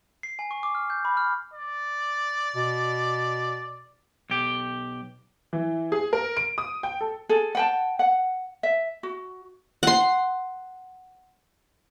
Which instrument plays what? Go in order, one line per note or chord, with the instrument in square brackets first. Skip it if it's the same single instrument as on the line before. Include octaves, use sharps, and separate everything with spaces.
[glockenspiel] C7
G#5
C#6
D6
F6
G6
B5
F6
[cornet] D5
[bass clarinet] B2
[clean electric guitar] B1 G4
[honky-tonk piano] E3
G#4
A#4
D7
D#6
G5
A4
[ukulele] G#4 A4
F#5 G5 A5
F#5
E5
F#4
[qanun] F#5 C6